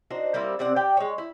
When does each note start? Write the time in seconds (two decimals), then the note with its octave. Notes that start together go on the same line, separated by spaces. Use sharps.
0.11 D4 D#4 F#4 C5
0.34 G3 A#3 C4 E4
0.59 C3 C4 D5 F#5
0.76 G4 D5 G5
0.97 G#3 C#5
1.18 E4